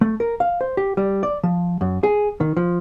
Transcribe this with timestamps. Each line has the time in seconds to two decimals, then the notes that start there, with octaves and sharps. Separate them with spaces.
0.01 A3
0.20 A#4
0.40 F5
0.61 C5
0.77 G4
0.97 G3
1.23 D5
1.43 F3
1.81 F#2
2.03 G#4
2.40 D#3
2.57 F3